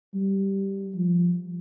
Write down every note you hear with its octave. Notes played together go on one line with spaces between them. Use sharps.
G3
F3